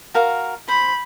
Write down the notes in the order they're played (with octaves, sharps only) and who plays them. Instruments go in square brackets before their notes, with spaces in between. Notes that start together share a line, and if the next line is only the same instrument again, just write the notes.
[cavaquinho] F#4 A#4 F5
[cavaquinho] C5 [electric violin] B5